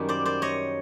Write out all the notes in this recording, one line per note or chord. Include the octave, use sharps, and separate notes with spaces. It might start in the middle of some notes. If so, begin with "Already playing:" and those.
Already playing: F#2 D#3 G3 A#3
C5 D5
C5 D5
C#5 D#5